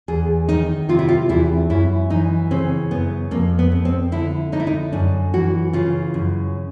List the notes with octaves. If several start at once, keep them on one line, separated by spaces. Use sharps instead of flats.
E2 G#4
D#3 D#4
C3 F4
E4
F4
E2 E4
F#2 E4
E3 D#4
C#3 C4
F#2 B3
F2 A#3
B3
F2
C4
D3 E4
D3 D#4
E4
D#4
F#2 D4
E3 F#4
C#3 F4
F#2